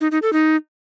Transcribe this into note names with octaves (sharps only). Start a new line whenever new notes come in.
D#4
D#4
A4
D#4